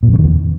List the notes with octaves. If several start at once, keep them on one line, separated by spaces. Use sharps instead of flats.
A#2
F2
C#3
D#3
E2